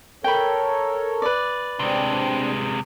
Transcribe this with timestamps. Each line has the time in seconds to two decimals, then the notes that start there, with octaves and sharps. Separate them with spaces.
0.24 A4 A#4 C#5 G5 B5
1.22 B4 D5
1.79 C3 G#3 C4 D4